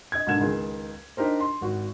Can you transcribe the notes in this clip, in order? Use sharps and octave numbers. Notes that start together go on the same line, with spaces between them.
D#5 G#6
B1 G#2 D3 A#3 G#6 E7
C#2 D#3 G#4
D4 D#4 G4 A#4 C5
C6
G#1 F#4